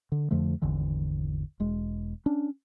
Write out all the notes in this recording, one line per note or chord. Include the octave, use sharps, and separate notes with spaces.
D3
F2 D3 F3 A3
G#1 E2 D3 E3
E1 G#3
C#4 D4